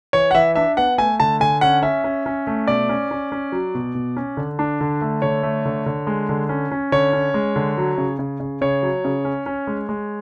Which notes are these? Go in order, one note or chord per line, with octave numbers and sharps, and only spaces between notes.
E3 C#5
F#5
E3 E5
D4 E5
B3 F#5
A3 G#5
D3 A5
D3 G#5
C#4 F#5
C#4 E5
C#4
C#4
A3
B2 D5
C#4
C#4
C#4
F#3
B2
B2
C#4
D3
D4
D3
A3
D3 C#5
A3
D3
D3
G#3
D3
C#4
C#4
D3 C#5
C#4
G#3
D3
F#3
C#3
C#3
C#3
C#3 C#5
F#3
C#3
C#4
C#4
G#3
G#3